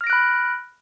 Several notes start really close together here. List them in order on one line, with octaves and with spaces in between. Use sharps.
F6 A#6 D7 F#6 B5